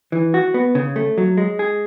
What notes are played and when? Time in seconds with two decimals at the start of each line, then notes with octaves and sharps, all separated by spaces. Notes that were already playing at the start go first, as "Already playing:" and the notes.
0.12 E3
0.34 F#4
0.54 B3
0.75 C#3
0.96 A3
1.18 F#3
1.38 G#3
1.59 G#4